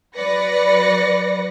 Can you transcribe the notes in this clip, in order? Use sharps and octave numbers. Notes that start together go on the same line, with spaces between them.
F#3 B4 D5 A#6 C#7